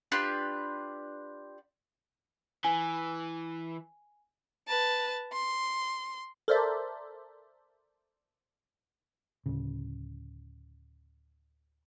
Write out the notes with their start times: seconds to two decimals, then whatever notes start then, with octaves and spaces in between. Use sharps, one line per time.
0.12 D4 F4 G4 B4
2.64 E3 G#5
4.68 B4 A5
5.33 C6
6.48 A4 A#4 C5 D5 E5
9.46 D1 C#3